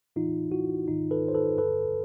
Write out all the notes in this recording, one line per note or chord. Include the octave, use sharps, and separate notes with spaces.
A2 E3 D#4 F4
E4 F#4
G#2 D#3 D#4 F4
A4 B4
C5
A4 B4
G2 D3 A4 B4